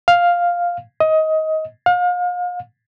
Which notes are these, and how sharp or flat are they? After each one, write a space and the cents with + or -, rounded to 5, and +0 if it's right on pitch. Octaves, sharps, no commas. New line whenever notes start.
F5 +5
D#5 +20
F5 +40